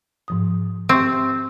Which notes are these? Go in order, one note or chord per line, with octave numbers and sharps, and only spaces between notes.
G#2 F3 D#6
C4 G4 E5 C#6